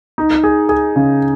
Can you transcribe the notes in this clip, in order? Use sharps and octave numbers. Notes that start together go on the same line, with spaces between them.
D#4
G#4
G#4
C#3